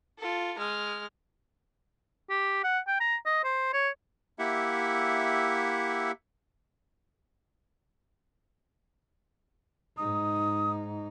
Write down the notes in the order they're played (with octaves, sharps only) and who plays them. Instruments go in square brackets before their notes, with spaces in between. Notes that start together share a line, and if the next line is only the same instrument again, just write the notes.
[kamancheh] F4 A4
G#3 F6
[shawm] G4
F#5
G5
A#5
D#5
C5
C#5
[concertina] A#3 E4 G4 E5 F#5
[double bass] G#2 D#4 [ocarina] D#6